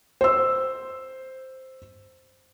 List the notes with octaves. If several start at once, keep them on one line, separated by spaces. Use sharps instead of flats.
C5 E6